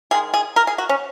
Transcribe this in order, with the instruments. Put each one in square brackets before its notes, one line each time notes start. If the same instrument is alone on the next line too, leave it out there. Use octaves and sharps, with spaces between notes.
[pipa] D#3 G#3 G#4
G#4
A#4
G#4
F#4
C#4